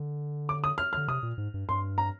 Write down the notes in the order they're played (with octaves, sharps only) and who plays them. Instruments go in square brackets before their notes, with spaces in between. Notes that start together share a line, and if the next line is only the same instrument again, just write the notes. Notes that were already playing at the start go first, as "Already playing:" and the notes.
Already playing: [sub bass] D3
[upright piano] D6
D#6
F6
F6
[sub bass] D3
[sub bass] C3 [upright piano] D#6
[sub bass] A#2
G#2
G2
[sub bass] G2 [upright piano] C6
[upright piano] A#5